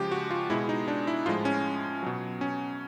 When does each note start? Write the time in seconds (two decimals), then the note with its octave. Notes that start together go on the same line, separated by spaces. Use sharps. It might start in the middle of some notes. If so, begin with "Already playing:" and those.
Already playing: C#3 F3 G#3 G4
0.11 F#4
0.31 F4
0.50 B2 G#3 E4
0.69 D#4
0.88 D4
1.07 E4
1.26 A2 F3 G#3 F4
1.45 C#4
2.03 B2 F#3
2.41 C#4